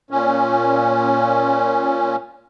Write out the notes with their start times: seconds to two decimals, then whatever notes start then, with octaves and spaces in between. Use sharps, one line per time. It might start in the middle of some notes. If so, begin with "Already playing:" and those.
0.11 A#2 C#4